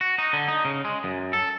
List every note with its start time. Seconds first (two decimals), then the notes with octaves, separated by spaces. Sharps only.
0.01 F#4
0.18 D#4
0.33 D3
0.48 D#4
0.65 C#3
0.85 G#3
1.04 F#2
1.33 A4